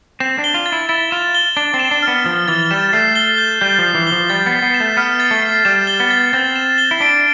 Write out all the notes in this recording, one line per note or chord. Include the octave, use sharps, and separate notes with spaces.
C4 E7
D4
G7
F4
A6
E4
E4 A6
F4 E7
G7
D4 A6
C4
E7
D4
F6
B3
F3 F6
E3 A6
G3 E7
A3 C7
G7
G6
G3 G6
F3 C7
E3
G7
F3
G3 A6
B3
C7
B3
E7
A3
B3 F6
A6
A3
C7
G3 E7
G7
B3
A6
C4 A6
E7
G7
E4
D4 D7